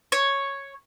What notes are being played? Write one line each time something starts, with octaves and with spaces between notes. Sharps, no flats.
C#5